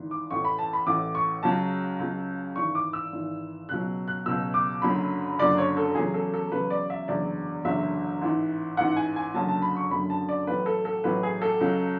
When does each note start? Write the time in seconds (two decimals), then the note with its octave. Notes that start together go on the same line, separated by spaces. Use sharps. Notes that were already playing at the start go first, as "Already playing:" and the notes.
Already playing: G#1 G#2 E3
0.11 D6
0.31 A1 A2 E3 C#6
0.45 B5
0.59 A5
0.73 B5
0.86 A1 A2 E3 D6
1.15 C#6
1.43 C#2 C#3 F#3 A5
1.99 C#2 C#3 F#3
2.56 G#1 G#2 E3 C#6
2.75 D6
2.93 E6
3.12 G#1 G#2 E3
3.69 C#2 B2 F#3 F#6
4.08 F#6
4.26 C#2 B2 F#3 E6
4.54 D6
4.82 F#1 F#2 D3 F#3 B5
5.38 F#1 F#2 D3 F#3 D5
5.58 C#5
5.77 A4
5.95 E2 C#3 F#3 G#4
6.14 A4
6.34 A4
6.52 E2 C#3 F#3 B4
6.70 D5
6.90 E5
7.08 F#1 E2 D3 F#3 D5
7.65 F#1 E2 D3 F#3 E5
8.22 A1 G#2 E3
8.77 A1 G#2 E3 F#5
8.96 G#5
9.16 G#5
9.34 F#1 F#2 D3 F#3 A5
9.49 A5
9.62 B5
9.77 C#6
9.90 F#1 F#2 D3 F#3 B5
10.10 A5
10.29 D5
10.47 A1 A2 F#3 B4
10.66 A4
10.85 A4
11.04 A1 A2 F#3 B4
11.23 G#4
11.42 A4
11.61 C#2 C#3 F#3